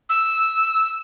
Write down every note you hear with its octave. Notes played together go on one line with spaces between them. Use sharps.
E6